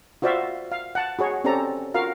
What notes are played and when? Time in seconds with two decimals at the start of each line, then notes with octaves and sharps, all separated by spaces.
0.22 F4 F#4 C5 D5 E5 F5
0.72 F5
0.95 F#5 A5
1.19 F#4 G#4 C#5
1.44 C4 C#4 G4 A4 D5 A#5
1.94 F4 F#4 A#4 F5